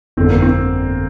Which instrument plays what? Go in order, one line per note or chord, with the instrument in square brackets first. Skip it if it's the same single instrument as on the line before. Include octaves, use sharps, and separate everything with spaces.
[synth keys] G1 F2 D3 [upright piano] C4
[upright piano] A#3
C4